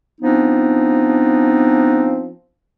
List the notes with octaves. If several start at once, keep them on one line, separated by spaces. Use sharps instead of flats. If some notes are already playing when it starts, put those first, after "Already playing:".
F3 B3 C4 D4 D#4